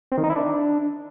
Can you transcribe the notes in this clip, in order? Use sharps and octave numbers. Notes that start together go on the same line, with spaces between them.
C4
D#3
D#4
E4
D4